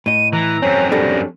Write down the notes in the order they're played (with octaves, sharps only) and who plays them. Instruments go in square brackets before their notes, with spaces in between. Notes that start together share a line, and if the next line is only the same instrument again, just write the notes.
[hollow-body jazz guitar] A2 D#5 [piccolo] D#7
[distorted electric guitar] E3 [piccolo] A#5
[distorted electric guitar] F#2 C4 [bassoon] C#4
[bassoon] G3 [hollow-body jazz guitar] C#4 D4 A4 [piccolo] A#6